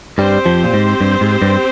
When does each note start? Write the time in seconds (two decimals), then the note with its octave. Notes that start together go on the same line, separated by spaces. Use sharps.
0.18 G2 G3 C4 G4 C5
0.46 F2 F3
0.64 A#2
0.74 G#2
1.01 G2
1.21 G#2
1.42 G2